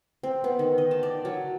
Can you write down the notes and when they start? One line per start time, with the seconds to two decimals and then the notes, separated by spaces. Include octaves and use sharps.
0.23 C4
0.44 B3
0.59 D#3
0.78 D#5
0.91 A5
1.03 D5
1.25 F#3